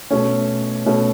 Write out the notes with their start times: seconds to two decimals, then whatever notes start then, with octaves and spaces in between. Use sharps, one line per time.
0.10 B2 A3 C#4
0.86 B2 A3 C#4